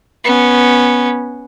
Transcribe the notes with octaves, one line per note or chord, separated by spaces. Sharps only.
B3 C#4